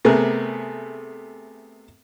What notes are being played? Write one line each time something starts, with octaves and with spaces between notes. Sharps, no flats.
C3 A3 B3 G#4 A#4